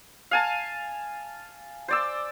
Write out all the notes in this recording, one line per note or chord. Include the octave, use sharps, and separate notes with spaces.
F5 G#5 A5
C5 D5 E6